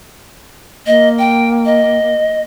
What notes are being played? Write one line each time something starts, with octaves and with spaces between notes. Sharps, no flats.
A#3 D#5
G5
D#5